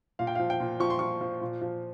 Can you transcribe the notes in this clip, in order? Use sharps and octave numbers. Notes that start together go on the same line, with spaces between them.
A#2 F5
G5
F5
F3
G5
A#2
F3 C#6
C6
F3 C#6
F3
A#2
F3